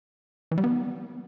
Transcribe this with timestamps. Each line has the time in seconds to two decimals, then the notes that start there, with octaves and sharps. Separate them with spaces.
0.51 E3
0.58 G3
0.64 B3